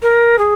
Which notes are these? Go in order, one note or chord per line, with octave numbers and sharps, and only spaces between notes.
A#4
G#4